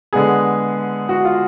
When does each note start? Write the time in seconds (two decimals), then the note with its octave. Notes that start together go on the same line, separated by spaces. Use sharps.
0.13 D3 G#3 B3 G#4
1.09 F#4
1.25 F4